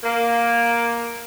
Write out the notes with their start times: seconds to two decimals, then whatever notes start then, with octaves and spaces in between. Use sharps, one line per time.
0.04 A#3